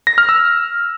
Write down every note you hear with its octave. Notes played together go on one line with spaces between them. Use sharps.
A#6
F6
E6